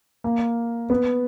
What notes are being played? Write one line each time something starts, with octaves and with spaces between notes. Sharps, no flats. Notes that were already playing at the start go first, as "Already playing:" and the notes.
A#3
B3